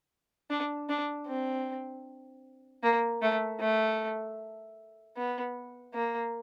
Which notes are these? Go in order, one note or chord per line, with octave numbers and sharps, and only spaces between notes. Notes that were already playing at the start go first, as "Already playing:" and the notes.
D4
D4
C4
A#3
A3
A3
B3
A#3